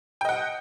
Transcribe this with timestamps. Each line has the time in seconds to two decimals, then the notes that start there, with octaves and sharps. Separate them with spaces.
0.21 G5
0.25 D#5
0.29 F#5